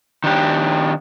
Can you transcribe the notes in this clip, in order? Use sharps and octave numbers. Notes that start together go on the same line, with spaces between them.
D#3 D4 G4